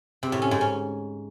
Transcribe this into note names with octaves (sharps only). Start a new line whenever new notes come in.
C3
A2
C#4
G#2
C#4